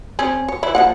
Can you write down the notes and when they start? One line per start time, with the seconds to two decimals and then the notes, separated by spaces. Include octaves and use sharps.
0.19 C4 C#4 G#4
0.48 C#5
0.63 E3 E4
0.75 F3 A#3 F#5